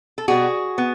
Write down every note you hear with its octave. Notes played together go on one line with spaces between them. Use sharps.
A4
B2 G3 B3 F#4 G#4
B3